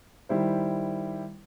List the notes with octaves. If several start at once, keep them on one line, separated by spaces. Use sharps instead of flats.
D#3 G3 E4 C5